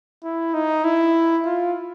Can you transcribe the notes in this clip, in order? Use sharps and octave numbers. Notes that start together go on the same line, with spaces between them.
E4
D#4
E4
F4